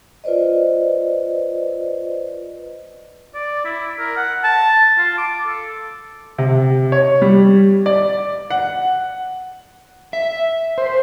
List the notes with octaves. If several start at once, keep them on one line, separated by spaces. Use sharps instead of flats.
F4 B4 C5 D5 D#5
D5
E4
A#4
F#5
A5
F4
D6
A4
C3
C#5
G3
D5
F#5
E5
C5